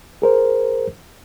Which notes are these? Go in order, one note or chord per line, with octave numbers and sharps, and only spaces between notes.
G#4 A#4 C5